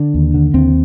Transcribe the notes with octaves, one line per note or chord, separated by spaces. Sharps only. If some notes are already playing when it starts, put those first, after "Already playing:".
Already playing: D3 D4
D#2
D3
D#2 C4